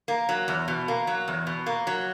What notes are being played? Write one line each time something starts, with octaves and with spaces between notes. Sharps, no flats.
A#3
F#3
E2
B2
A#3
F#3
E2
B2
A#3
F#3